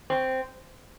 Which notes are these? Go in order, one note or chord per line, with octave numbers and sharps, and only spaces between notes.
C4